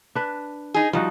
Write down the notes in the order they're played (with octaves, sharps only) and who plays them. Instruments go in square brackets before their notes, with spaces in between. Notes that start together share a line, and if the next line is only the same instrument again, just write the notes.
[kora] D4 B4
[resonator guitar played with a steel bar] D#4 G#4
[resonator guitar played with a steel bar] F3 [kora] G3 D#4 F#4